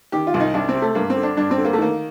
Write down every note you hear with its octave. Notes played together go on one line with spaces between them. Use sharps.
D#3 G4
F4
C2
D#4
C2 D4
C4
C3
A3
G2 A#3
C4
D3
D4
G2 D4
C4
D3
A#3
A3
D#3 A#3